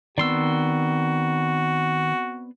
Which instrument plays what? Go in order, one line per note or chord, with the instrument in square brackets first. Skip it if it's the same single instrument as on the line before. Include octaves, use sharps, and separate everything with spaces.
[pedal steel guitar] D#3 C6 E6 [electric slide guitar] B3 C4 D5 [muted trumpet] F#4